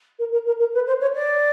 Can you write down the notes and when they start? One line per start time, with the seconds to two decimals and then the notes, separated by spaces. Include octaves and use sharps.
0.18 A#4
0.32 A#4
0.46 A#4
0.59 A#4
0.73 B4
0.86 C5
1.00 C#5
1.14 D5